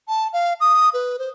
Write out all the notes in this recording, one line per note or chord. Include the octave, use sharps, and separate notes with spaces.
A5
F5
D#6
B4
C5